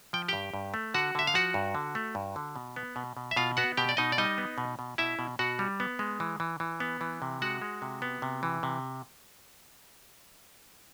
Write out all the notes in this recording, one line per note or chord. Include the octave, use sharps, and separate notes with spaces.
F3 G5
G2 G4 G5
G2
A3
D3 F#4 F#5
D3 E5
F5
F3 F#4 F#5
G2
D3
A3
G2
D3
B2
B3
B2
B2
E5
B2 F4 F5
B3 F#4 F#5
B2 G4 G5
D5
B2 D#4 D#5
D5
G3 D#4 D#5
B3
B2
B2
B2 E4 E5
B2
B2 F#4 F#5
G3
B3
G#3
E3
E3
E3
B3
E3
C3
G#3 F#4 F#5
G#3
C3
B3
C3
E3
C3